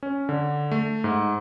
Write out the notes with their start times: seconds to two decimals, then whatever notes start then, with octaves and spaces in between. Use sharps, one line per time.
0.03 C#4
0.29 D3
0.71 A3
1.04 G#2